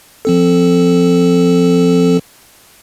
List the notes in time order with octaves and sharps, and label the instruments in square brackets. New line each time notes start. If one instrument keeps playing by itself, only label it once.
[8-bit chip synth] F3 C4 A4